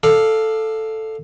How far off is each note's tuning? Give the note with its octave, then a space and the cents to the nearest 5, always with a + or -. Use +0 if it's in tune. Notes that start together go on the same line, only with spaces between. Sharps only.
A4 +0 D5 +30 F5 +0